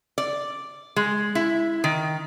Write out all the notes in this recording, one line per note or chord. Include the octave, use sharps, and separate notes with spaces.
D5
G#3
E4
D#3